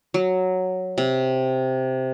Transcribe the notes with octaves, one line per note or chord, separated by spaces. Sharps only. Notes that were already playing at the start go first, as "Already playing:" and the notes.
F#3
C3